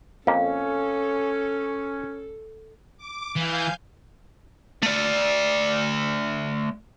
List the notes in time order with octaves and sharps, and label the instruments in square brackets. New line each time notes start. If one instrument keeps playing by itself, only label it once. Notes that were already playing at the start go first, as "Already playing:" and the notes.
[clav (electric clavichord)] F2 A#3 [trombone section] C#4 [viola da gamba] A4 [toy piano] F5
[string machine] D6
[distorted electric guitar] E3 [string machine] F5 G#5 G6
[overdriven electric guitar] A3 D5